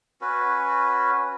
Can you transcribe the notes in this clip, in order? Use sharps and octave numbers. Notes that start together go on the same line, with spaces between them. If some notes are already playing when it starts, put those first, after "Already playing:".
C#4 F#4 B4